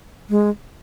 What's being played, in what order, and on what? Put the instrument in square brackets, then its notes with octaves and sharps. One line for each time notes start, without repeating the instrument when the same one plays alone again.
[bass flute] G#3